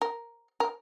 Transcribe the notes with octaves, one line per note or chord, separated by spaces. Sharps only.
A#4
A#4